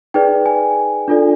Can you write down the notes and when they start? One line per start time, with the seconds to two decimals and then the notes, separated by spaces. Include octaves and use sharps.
0.14 D#4 G#4 B4 D5 G5
0.46 G#5
1.08 D4 F4 A4 D5